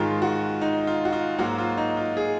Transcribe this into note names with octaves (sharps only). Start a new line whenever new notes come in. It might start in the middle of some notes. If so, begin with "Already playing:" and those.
Already playing: G#2 D#3 G#3 F4
F#4
D#4
F4
F#4
F4
G#2 F#3 A#3 F#4
F4
D#4
F4
G#4